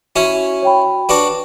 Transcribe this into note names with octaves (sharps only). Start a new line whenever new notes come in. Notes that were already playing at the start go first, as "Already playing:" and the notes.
C#4 E4 F#4
C#5 G5 B5
D4 F#4 B4